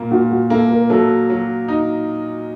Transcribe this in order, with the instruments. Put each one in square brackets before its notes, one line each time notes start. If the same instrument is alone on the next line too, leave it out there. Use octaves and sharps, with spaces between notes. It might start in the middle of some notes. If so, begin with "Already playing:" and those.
Already playing: [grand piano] A#2 A#3
[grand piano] A#2 [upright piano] F#4
[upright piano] F#4
[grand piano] A#3 [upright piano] A4
[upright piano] A#4
[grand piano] F#3 [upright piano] A4
[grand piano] F#3
D#4